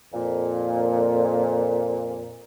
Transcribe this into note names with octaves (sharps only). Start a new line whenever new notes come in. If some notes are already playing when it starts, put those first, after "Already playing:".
F2 A#2